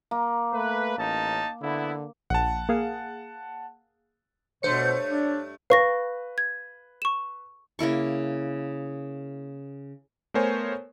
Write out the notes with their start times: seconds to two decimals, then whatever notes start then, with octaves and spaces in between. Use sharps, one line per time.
0.11 A#3
0.53 A3 B4
0.98 A1 C#4 D#4 A5
1.62 D3 B3 E4
2.30 A#1 F#5 A5
2.69 A#3 G#4 F5
4.63 G2 B2 A3 C5 C#5 C#7
5.09 D4
5.70 B4 F5 C#6 A#6
6.38 G#6
7.02 C#6 E7
7.79 C#3 A#3 E4 C#6
10.34 A3 B3 A#4 C5 C#5 G#5